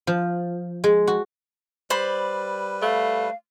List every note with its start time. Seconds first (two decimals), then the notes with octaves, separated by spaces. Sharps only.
0.07 F3
0.84 G#3
1.07 F#4
1.90 G3 B4 C5 D5 B5
2.82 A3 F5